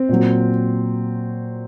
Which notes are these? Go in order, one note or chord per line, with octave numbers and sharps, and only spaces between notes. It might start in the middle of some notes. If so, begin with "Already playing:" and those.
Already playing: C4
A#2 F#3